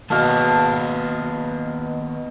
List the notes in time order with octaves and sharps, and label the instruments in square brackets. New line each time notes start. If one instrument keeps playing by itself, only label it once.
[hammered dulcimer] B2 F5 A5 [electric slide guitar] D#3 A#3 B4